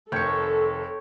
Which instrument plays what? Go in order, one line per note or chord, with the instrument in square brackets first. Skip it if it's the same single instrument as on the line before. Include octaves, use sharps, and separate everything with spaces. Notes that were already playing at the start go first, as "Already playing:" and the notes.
[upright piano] F1 D#3 C#7 [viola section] A4 [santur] C#5 G5 C#6